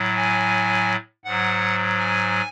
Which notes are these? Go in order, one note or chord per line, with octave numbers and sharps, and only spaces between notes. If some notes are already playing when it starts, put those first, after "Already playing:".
Already playing: A2 F#3
G#5
G#2 F#3 F#5
G#5